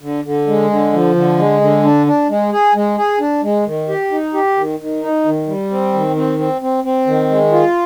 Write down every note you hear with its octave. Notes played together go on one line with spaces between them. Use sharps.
D3
D3
G#3
D3
F3
D3
G#3
D3
D4
D4
G#3
G#4
G#3
G#4
D4
G#3
D#3
G4
D#4
G4
D#3
D#3
D#4
D#3
G3
C4
D#3
C4
C4
C4
C4
D#3
G#3
F4